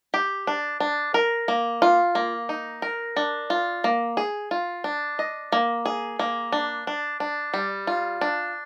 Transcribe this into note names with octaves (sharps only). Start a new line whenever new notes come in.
G4
D4
D4
A#4
A#3
F4
A#3
D#4
A#4
D4
F4
A#3
G#4
F4
D4
D#5
A#3
G#4
A#3
D4
D4
D4
G3
F4
D4